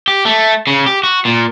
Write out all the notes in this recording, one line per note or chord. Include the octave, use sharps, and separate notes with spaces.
G4
A3
C#3
G4
F#4
A#2